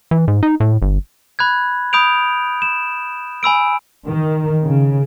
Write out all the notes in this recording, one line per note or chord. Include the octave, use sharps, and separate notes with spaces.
E3
G#2
D#4
A2
G1
B5 F#6 G#6
B5 D#6 G6 D7 F7
E7
G#5 B5 E6 D7
D#3
C#3